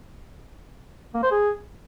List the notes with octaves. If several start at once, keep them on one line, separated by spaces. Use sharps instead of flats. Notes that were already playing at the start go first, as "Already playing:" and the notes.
A#3
C5
G#4